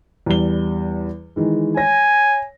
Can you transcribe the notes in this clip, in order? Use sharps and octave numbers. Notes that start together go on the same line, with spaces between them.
E2 G3 G7
D#3 E3 G#3
C#5 G#5 A#6